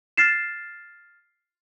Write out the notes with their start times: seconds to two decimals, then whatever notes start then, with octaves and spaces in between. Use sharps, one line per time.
0.17 F6 A6 C7 E7